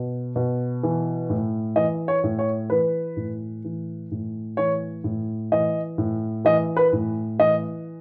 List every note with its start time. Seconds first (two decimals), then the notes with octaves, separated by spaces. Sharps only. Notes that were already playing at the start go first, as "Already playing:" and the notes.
Already playing: B2
0.36 B2
0.83 E3
1.30 A2
1.76 E3 D#5
2.08 C#5
2.24 A2
2.39 C#5
2.70 E3 B4
3.16 A2
3.64 E3
4.11 A2
4.57 E3 C#5
5.04 A2
5.52 E3 D#5
5.98 A2
6.45 E3 D#5
6.77 B4
6.93 A2
7.39 E3 D#5